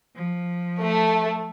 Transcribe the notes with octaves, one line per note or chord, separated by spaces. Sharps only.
F3
A3